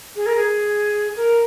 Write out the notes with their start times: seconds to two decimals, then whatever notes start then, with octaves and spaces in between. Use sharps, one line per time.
0.15 G#4
0.26 A#4
0.36 G#4
1.16 A#4